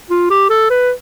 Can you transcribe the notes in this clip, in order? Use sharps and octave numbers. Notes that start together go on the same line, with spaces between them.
F4
G4
A4
B4